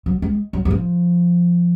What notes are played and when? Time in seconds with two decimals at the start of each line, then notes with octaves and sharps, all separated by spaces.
0.06 F#3
0.22 G#3
0.53 F#3
0.65 F#3
0.71 F3